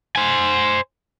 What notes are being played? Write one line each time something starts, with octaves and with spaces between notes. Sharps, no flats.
C5 G#5